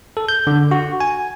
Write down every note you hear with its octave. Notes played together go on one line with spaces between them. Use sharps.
A4
G6
D3
F#4
G#5